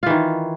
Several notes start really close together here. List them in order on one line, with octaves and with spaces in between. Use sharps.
F4 E3 D#3